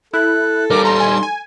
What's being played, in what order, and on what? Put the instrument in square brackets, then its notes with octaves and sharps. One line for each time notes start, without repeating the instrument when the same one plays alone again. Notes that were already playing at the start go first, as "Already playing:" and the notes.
[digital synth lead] E4 [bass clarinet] A4 [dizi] F#6
[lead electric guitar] G3 D#4 [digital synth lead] A#4 [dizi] D6
[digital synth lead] A#5 [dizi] C6
[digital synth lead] G#5
G#5